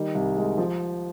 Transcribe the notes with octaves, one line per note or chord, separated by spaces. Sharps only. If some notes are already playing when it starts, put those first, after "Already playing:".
Already playing: D#3 G3
C2
G#3
F3